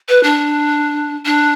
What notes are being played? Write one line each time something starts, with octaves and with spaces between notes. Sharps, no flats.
B4
D4
D4